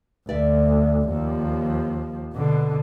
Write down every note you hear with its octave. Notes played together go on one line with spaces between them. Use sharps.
D2 D5 E5
D#2 F3
B2 D3